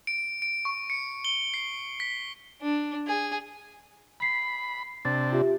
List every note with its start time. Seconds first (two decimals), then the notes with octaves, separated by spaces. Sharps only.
0.07 D7
0.42 D7
0.65 C#6
0.90 C#7
1.25 G7
1.54 C7
2.00 B6
2.62 D4
3.07 G#4
4.20 B5 B6 C7
5.05 C3 D4 A6
5.32 F4 G4 E5